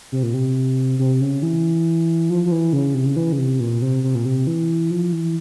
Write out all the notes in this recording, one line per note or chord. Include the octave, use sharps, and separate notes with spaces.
C3
A#2
C3
C3
C#3
E3
F3
F3
E3
C#3
C3
C#3
E3
C#3
C3
A#2
C3
C3
A#2
C3
E3
F3
E3